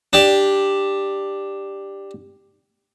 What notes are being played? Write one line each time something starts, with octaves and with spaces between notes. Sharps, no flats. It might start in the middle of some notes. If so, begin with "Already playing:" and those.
D4 G4